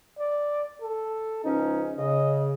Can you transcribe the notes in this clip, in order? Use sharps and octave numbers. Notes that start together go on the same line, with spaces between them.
D5
A4
C#2 F3 C#4 D#4
C#3 D#5